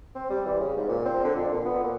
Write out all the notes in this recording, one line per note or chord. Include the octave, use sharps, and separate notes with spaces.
C4
G3
E3
C#3
G#2
A#2
C4
D3
F2
A#2
B3
A#2